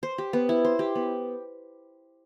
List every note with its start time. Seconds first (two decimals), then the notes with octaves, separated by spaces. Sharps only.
0.03 C5
0.18 G4
0.33 B3
0.49 E4
0.64 C5
0.79 G4
0.95 B3